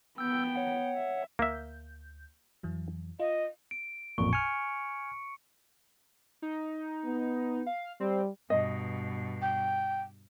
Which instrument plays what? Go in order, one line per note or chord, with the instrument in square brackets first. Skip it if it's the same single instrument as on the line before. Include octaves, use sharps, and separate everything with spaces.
[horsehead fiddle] B3 G5 [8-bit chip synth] E6 G6
[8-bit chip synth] C#5 F#5
[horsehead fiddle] E5
[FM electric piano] D2 G6 [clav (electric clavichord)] A#3 E5
[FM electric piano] F2 E3 F#3
[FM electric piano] F4 [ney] D#5
[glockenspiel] D7
[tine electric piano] A1 F2 A#2 [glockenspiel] C#6
[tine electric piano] G#5 F6 [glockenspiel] C#7
[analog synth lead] D#4
[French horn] B3
[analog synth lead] F5
[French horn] G3 [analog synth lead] C4
[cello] G2 B2 [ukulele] D#5
[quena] G5